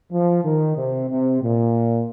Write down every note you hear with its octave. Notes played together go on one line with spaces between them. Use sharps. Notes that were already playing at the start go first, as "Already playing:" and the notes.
F3
D#3
C3
C3
A#2